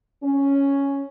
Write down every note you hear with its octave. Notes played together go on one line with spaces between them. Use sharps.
C#4